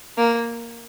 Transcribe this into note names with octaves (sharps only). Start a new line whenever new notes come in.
A#3